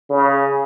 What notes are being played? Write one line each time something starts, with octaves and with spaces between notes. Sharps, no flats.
C#3